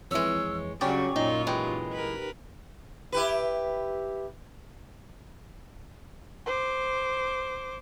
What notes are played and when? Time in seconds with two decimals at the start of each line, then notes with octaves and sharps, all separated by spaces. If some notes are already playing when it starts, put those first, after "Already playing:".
0.11 F2 E3 G#3 C#5 E6
0.81 G2 C#3 F#3 C#4 F#4 G4 D5 C#6
1.16 F#2 A#2 D#4 F4
1.47 E3 G#3 D#4 G4
1.93 A#4 B4
3.12 E4 G4 B4
6.46 C5 D6